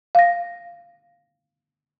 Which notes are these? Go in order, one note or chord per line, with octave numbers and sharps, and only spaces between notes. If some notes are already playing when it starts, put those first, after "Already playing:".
F5 A#6